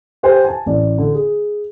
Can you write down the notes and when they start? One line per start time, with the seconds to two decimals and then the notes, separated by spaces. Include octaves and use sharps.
0.23 G4 B4 C5 G5 G#5
0.44 G#5 A5
0.66 A1 D5
0.98 D3
1.15 G#4